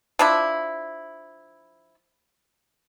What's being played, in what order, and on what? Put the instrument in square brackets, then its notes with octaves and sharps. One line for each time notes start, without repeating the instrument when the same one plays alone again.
[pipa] F3 D4 E4